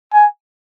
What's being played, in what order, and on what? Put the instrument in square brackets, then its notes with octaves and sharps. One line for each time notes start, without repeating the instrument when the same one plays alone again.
[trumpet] G#5